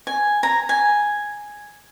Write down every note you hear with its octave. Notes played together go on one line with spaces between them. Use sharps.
G#5
A#5
G#5